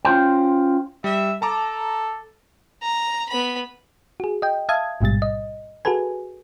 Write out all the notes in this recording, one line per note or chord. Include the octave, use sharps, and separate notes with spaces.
C#4 F4 C5 G5
G3 E5
A4 A5 A#5 D6
A#5
B3 B5
F#4 G#4
D#5 G5
E5 F5 A5 D#6 G#6
A1 G#2 B2 G3 A6
D#5
F#4 G#4 A4 B4 G#5